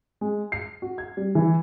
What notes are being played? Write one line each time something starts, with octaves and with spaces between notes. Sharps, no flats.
G#3
C7
F#4
G#6
G3
E3